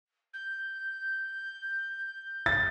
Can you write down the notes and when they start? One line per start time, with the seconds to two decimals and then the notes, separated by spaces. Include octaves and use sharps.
0.33 G6
2.46 A6